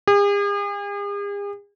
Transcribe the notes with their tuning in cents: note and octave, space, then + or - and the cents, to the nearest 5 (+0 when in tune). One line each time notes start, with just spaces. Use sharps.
G#4 -45